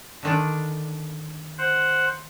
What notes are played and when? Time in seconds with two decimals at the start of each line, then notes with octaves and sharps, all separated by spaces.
0.23 D3 D#3 D4
1.58 C5 F#5